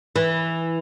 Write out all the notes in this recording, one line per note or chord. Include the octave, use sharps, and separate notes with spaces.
E3